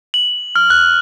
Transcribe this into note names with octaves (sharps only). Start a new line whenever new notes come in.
F#7
F6
F#6